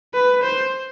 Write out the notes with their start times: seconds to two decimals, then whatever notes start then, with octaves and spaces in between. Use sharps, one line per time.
0.14 B4
0.43 C5